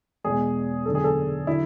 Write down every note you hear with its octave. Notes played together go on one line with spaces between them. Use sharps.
E2 B2 G#3 G#4
F#1 E2 D3 A4
G#4
A4
D3 F#3 E4